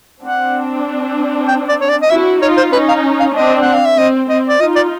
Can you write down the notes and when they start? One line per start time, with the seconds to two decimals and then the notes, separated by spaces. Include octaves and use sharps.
0.22 C4 D4 F#5
1.48 G5
1.68 D5
1.81 C#5
1.89 D5
2.02 D#5
2.10 E4 F#4 E5
2.41 D#4 F4 C#5
2.57 C5
2.72 C#4 D#4 B4
2.88 F5
3.20 F5
3.35 C4 D4 D#5
3.61 F#5
3.74 F5
3.85 E5
3.97 C4 D#5
4.29 C4 D#5
4.48 D5
4.60 D#4 F4 D#5
4.76 D5